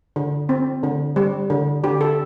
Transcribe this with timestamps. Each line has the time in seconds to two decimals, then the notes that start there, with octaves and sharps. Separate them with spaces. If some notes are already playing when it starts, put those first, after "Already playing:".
0.16 D3
0.49 C4
0.83 D3
1.16 G3
1.50 D3
1.84 D3 G4
2.01 A4